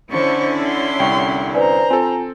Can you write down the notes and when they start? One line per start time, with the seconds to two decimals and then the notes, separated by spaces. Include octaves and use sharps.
0.12 D3 C#4 E4 C5 C#6
0.65 C6
1.00 C2 G5 C#6
1.54 B4 C5 D5 G#5 A#5
1.90 C4 F4 A4 G#5